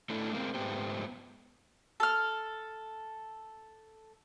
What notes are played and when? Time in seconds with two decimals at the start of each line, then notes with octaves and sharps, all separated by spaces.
0.10 A3 C#4 D4 E4 A4
0.33 G#3 A#3 C4
0.54 G#2 B2 A3 B3 G4 C5
2.00 A4 F6